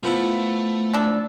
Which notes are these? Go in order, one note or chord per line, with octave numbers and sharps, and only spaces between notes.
F3 A3 B3 E4
D4 A4